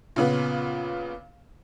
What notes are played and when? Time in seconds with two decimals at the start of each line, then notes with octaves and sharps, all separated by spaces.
0.16 A#2 C#3 B3